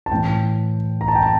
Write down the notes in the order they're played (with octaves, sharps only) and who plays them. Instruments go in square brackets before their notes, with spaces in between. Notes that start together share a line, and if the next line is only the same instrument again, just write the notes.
[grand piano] A5
A2 E3 G5
A#5
A5
G5
A5